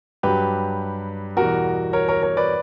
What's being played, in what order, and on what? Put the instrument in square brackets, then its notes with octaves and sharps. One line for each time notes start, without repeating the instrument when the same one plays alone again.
[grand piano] G2 F#3 G4 B4
E2 B2 G3 F#4 A#4
A#4 C#5
A#4 C#5
A#4 C#5
B4 D5